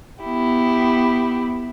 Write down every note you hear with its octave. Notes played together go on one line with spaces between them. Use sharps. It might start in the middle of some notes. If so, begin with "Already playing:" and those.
B3 E4 G4